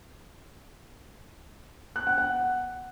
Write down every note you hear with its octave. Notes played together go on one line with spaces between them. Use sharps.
F#6
F#5
F#5